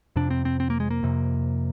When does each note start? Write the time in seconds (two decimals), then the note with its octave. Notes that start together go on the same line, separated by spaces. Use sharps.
0.16 F2 C3 D4
0.31 C4
0.45 C4
0.60 C4
0.70 A#3
0.80 G#3
0.91 A#3
1.03 F2 C3